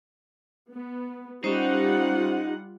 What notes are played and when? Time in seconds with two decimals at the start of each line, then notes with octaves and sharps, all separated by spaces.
0.71 B3
1.44 G3 C#4 D#4 F4 C5 F#5